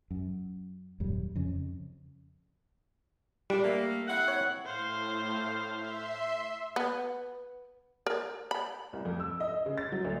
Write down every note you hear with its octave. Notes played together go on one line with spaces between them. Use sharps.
F#2
D#1 F#2 G3
F2 C#3
A#2 G3 D4
A3 A#3
C4 E4 F#5
C#5
A2 C5 F5
E5 C6
B3
A#4
B5
C2
F2
E6
D#5
D#5
C#3
A6
F#3
D2